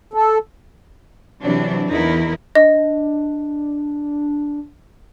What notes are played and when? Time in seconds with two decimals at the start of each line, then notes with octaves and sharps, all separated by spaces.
0.14 A4
1.42 C3 E3 F#3 D4
1.88 E2 D#4 E4 A#4
2.55 D4 D#5